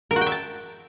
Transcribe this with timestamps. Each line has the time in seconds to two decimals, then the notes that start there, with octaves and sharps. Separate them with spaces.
0.11 A#4
0.16 F#4
0.21 G5
0.27 E5
0.32 A5